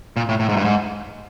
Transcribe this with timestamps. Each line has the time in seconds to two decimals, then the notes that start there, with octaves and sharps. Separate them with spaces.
0.17 A#2
0.29 A2
0.40 A2
0.49 G#2
0.57 G2
0.65 G#2